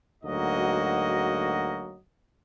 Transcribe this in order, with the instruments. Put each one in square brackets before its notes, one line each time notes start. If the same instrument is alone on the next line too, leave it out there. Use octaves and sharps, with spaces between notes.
[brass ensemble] D2 G#2 F#3 A#3 F#4 D#5